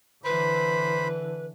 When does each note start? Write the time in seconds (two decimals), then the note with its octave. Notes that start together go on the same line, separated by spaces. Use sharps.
0.24 D3 E3 B4 C5 B5